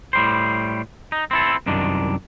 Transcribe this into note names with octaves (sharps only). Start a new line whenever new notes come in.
A2 G3 C5
D#4
C4 E4 A4
C2 F#2 D#3 D4